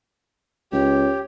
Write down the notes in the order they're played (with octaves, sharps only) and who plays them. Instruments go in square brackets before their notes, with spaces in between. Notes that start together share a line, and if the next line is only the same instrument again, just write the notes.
[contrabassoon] C#2 [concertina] G4 [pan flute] C#5